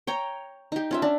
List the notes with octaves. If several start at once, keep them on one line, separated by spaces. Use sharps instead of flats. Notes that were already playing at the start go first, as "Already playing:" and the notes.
C#5 G5 A#5
D#4 G4
C#4 F4 E5
D4